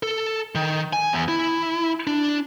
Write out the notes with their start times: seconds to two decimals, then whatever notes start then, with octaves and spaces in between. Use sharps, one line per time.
0.03 A4
0.55 D#3
0.93 G#5
1.13 E2
1.28 E4
2.07 D4